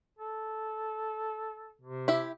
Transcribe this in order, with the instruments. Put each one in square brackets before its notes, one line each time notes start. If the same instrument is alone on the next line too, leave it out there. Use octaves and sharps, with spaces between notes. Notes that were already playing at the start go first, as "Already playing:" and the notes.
[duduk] A4
C3
[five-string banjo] E4 G4 E5